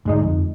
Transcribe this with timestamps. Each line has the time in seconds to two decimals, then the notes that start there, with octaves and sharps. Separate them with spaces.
0.05 G#2 D3 G#3 D#4
0.23 F2